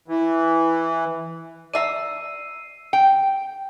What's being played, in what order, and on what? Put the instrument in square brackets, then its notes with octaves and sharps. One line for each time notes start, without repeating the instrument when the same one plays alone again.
[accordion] E3
[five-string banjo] D5 E5 A#5 [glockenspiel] E6 C7 D#7
[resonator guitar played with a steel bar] G5